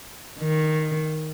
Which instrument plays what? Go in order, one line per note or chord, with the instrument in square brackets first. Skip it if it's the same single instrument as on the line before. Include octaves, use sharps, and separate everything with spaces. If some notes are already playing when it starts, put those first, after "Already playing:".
[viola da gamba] D#3